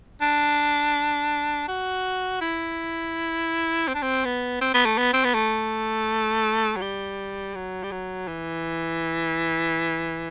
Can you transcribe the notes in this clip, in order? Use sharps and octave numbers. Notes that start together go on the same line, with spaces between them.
D4
F#4
E4
C4
D4
C4
B3
C4
B3
A3
B3
C4
B3
A3
F#3
G3
F#3
G3
F#3
E3